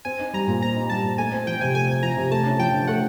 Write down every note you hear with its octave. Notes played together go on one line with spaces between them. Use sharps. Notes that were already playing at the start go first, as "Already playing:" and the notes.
C4 G#5
D#4
G3 A#5
A#2
C4 A#5
D#4
G3 A5
A#2
A3 G#5
C4
F3 G5
C3 G#5
A3 G#5
C4
F3 A#5
C3
A3 A5
C#4
F3 G5
D3
A3 F#5